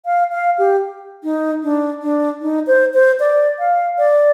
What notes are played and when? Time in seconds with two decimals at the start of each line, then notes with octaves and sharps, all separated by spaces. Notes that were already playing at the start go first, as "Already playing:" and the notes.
0.05 F5
0.32 F5
0.58 G4
1.24 D#4
1.63 D4
2.02 D4
2.42 D#4
2.67 C5
2.94 C5
3.20 D5
3.59 F5
3.98 D5